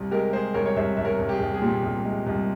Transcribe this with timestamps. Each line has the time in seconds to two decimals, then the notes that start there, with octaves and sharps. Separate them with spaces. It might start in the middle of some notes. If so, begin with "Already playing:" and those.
Already playing: C2
0.11 G#3 G4 A#4
0.33 G#3 G#4 C5
0.54 C2 A#4 C#5
0.66 C#5
0.76 C2 C5 E5
0.97 C2 E5
1.05 A#4 C#5
1.19 C2
1.29 G4
1.33 G#4
1.40 C2
1.54 G#4
1.62 A#2 G4
1.83 C2
2.05 G#3
2.27 C2